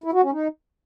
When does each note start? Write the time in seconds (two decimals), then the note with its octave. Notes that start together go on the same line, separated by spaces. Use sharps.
0.04 E4
0.13 F#4
0.23 C#4
0.32 D#4